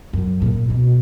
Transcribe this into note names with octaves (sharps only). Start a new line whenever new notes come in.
F#2
A#2
B2